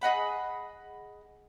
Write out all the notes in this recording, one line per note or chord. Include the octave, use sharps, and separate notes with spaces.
G#4 D#5 F#5 B5